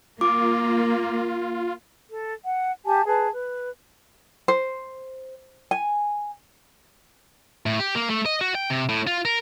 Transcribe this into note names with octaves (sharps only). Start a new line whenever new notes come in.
A#3 F4 D6
A4
F#5
G4 G#5 A5
G#4 B4 A5
B4
C5
G#5
A2
G4
A#3
A3
D#5
F#4
G5
C3
A2
F4
A#4